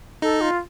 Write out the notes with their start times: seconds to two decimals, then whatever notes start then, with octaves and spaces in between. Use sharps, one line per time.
0.22 D#4 A4
0.41 F4